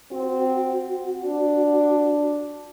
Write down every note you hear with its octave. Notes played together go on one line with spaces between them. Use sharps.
C4 F#4
D4